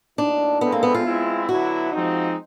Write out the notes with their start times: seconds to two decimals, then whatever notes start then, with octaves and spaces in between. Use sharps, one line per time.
0.18 A2 F#3 A#3 D4 D#4
0.61 G#3 B3 C4 E4 A4
0.72 A#3
0.83 B3
0.94 F4
1.05 G#3 C4 E4
1.48 D3 F#3 B3 E4 F#4
1.92 F3 G#3 C4 D#4